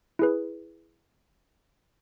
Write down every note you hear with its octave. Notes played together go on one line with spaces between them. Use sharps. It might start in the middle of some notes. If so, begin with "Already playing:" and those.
E4 G#4 B4